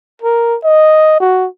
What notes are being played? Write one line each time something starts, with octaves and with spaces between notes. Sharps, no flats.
A#4
D#5
F#4